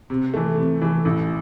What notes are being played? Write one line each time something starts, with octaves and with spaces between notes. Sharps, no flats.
C3
E3 A3
C3
E3 A3
A1